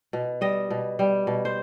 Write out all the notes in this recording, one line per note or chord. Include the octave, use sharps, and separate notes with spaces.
B2
G3 D#5
B2
G3
B2
C5